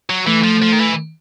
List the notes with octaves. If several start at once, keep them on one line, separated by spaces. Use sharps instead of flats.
F#3
E3 A3
F3
F3
D#3
E3